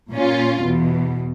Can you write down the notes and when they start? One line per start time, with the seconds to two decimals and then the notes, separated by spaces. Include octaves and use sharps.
0.12 A#2 C#4 F4
0.63 E2 B2